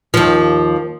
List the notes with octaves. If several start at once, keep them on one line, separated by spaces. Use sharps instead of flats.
D#2 F3